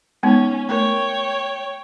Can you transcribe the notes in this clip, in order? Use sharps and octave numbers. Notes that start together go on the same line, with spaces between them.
G#3 B3 C#4 D#4
A3 A#4 C#5 G5